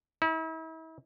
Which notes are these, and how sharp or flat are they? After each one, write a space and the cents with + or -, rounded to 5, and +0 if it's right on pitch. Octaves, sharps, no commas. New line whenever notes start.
E4 -40